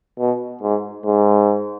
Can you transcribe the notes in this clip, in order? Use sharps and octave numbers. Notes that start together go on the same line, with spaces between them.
B2
G#2
G#2